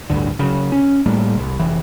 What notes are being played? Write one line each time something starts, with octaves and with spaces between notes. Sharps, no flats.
A1 D2 G2 D3
C#3 F#3
C#4
A2 G3 A3 A#3
C2
F1 E3